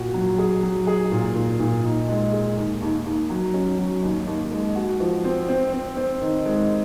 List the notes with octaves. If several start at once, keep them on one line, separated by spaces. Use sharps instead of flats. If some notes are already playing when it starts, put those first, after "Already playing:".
Already playing: A#2 F#4
F#3
G#4
F#3
G#4
A#2
A#2
A#2
D#4
G#3
G#4
D#2
D#2
D#2
F#3
C#4
F#3
D#2
D#2
G#3
F#4
F3
C4
C4
C4
C4
D#3
G#3